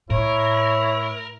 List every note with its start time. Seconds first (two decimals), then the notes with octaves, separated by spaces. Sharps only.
0.10 A2 E4 A#4 C#5